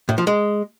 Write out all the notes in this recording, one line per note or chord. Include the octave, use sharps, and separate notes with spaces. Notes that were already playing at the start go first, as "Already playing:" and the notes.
A2
F3
G#3